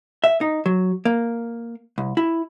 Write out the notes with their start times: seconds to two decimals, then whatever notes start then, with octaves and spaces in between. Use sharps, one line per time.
0.24 E5
0.41 D#4
0.66 F#3
1.05 A#3
1.98 C2
2.17 E4